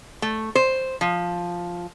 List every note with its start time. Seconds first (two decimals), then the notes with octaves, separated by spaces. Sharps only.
0.22 A3
0.55 C5
1.01 F3